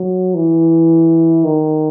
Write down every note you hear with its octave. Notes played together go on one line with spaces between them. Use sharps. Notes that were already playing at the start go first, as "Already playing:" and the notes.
Already playing: F#3
E3
D#3